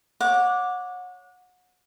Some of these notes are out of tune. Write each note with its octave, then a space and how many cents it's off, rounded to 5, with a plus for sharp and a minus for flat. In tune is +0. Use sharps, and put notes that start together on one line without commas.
C#5 +0 F#5 -30 D6 +0